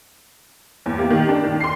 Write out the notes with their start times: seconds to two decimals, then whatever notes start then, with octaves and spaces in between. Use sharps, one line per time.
0.86 E2
0.98 A#3 G4
1.10 D#3
1.29 D4
1.44 D#3
1.61 C6 C7